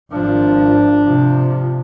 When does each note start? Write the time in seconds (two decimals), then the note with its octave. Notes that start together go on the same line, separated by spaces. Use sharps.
0.13 G#1 F3 D4
1.05 C3 F3